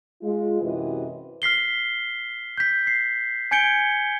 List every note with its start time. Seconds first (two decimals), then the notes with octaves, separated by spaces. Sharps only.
0.22 G#3 F4
0.61 F#2 C3 E3 F#4 B4 D#5
1.42 F6 B6 C7 G7
2.58 G6 B6
2.87 C7
3.51 G#5 G6 G#6 C#7 D7 G7